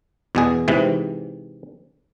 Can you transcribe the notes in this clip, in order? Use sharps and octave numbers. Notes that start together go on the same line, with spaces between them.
E2 B2 G#4
G#2 C3 E3